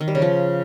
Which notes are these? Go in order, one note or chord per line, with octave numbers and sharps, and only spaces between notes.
D#3
G3
C#3
F3